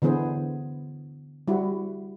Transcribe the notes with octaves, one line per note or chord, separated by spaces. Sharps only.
D3 E3 B3 G#4 C5
G3 E4 F#4